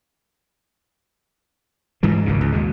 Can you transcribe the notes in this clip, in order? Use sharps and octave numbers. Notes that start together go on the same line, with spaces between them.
G#2 E3 F3
G#1 C#2 F#2 C#3
C#2
D#2 B2 G#3